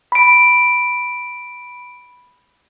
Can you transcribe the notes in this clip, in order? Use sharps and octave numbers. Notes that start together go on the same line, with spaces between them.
B5 D7